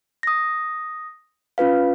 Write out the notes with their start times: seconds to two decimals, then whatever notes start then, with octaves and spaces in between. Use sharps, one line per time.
0.23 D#6 A#6
1.58 C#4 F4 B4 F5